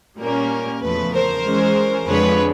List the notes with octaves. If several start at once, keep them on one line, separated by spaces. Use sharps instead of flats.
A#2 G3 A#3 C#4 A#4
E2 C#3 F3 A3 B4
A#4 C5
E3 G#3 C#4
F2 D3 F3 G#3 B4 C#5